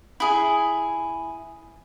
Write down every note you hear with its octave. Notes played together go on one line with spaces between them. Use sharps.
E4 G#4